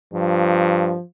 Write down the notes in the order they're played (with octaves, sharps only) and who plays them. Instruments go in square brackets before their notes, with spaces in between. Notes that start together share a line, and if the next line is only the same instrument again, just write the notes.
[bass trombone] G2 [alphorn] F3